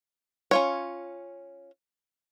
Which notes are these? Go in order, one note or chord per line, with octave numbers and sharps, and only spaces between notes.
C#4 F4 C#5